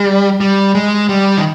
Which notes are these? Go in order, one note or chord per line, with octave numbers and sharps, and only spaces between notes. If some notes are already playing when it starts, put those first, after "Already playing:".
Already playing: G3
G3
G#3
G3
D#3